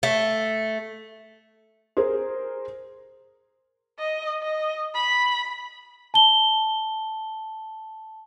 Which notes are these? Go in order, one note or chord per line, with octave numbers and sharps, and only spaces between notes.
A3
G#4 A#4 C5
D#5
D#5
B5
A5 G7